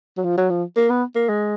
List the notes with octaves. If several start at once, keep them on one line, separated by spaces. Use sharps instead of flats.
F#3
F3
F#3
F3
A#3
B3
A#3
G#3